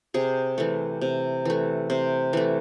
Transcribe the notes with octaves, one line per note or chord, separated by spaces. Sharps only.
C3 G#4
E3 A3
C3
E3 A3
C3 C5
E3 A3